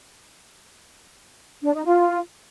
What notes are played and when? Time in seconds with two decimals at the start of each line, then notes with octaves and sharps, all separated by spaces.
1.63 D4
1.74 D#4
1.85 F4